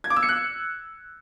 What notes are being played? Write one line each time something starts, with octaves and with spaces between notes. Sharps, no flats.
G#6
D6
E6
C#7
F#6